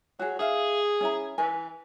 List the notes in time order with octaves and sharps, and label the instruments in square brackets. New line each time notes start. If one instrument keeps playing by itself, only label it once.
[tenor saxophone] F#3 [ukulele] F#4 G#4
[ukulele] D#4 E5 F5 [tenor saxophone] G#4
[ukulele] C#4 E4 A#5
[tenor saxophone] E3 [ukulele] G#5